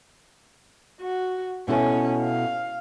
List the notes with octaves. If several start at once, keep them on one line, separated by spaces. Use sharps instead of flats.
F#4
B2 C#4 E4 A4
F5